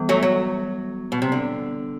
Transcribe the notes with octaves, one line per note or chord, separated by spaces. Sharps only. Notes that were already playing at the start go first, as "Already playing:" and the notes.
Already playing: E3 G3 B3
F#3 A3
F#3
B2
C3
D3